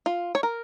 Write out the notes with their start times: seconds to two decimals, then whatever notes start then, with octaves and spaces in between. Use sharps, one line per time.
0.06 F4
0.35 C#5
0.43 A#4